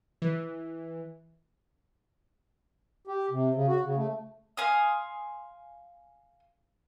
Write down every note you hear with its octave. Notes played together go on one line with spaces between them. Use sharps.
E3
G4
C3
C#3
F#4
C#3
A3
F5 G#5 C6 D#6